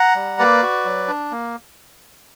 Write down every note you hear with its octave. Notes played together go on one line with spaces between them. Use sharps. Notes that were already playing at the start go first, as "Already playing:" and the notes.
Already playing: F#5 A#5
G3
A#3 B4 D5
F#4
F#3
D4
A#3